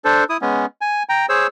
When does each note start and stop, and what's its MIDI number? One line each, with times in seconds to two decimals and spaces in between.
0.05 0.24 62
0.05 0.24 69
0.05 0.24 72
0.29 0.37 64
0.29 0.37 87
0.42 0.66 56
0.42 0.66 59
0.42 0.66 61
0.81 1.03 80
1.09 1.26 79
1.09 1.26 82
1.29 1.47 68
1.29 1.47 72
1.29 1.47 73
1.29 1.47 88